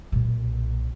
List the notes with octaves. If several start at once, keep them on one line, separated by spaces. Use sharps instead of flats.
B1 A#2